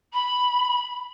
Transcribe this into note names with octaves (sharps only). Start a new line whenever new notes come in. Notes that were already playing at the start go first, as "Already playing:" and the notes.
B5